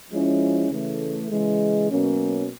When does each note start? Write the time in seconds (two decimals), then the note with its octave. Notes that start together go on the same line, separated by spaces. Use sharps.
0.10 F3 G#3 C#4 E4
0.70 C#3 E3 A3
1.30 C#3 E3 G#3
1.89 B2 F#3 A#3 C#4